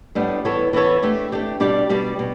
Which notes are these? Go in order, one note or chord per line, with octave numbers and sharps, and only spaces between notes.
A2 G3 B3 D4
E3 B3 E4 A4 C#5
E3 B3 E4 A4 C#5
A3 D4 G4
A3 D4 G4
B2 G3 D4 G4 D5
B2 G3 D4 G4 D5
B2